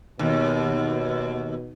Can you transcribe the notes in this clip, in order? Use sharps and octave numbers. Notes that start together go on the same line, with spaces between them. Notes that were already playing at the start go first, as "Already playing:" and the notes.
D#2 B2